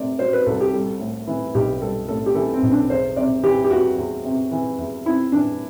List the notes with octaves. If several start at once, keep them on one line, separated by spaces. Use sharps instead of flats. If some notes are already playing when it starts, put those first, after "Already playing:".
Already playing: C3 A3 D5
F#3 C5
B4
C2 A4
G4
G3 A4
A2
E3
B1 G4
G3 A4
A2 A4
G4
E3 A4
C4
B1
D4
E2 C5
C3 D5
E3 G4
G4
E2 F#4
E2
C3
E3
E2
C4 E4
E3 D4